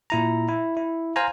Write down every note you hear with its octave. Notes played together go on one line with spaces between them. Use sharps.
A#2 E4 A#5
E4
E4
C5 F5 G#5 A#5